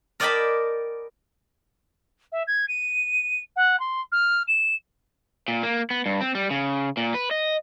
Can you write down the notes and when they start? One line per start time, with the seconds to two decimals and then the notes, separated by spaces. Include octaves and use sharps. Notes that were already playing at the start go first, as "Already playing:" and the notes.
0.20 A#4 D5 D#5 G5 A5 B5
2.32 E5
2.47 G#6
2.68 D#7
3.56 F#5
3.80 C6
4.12 F6
4.48 E7
5.48 A#2
5.63 A#3
5.90 B3
6.06 G2
6.21 C4
6.35 G3
6.51 C#3
6.97 A#2
7.14 B4
7.31 D#5